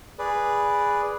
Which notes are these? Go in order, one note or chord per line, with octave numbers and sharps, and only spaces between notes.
G#4 B4 D5